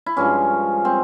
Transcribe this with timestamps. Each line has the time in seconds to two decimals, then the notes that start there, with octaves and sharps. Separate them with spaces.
0.06 E4
0.16 G2 F3 G#3 C#4
0.85 C4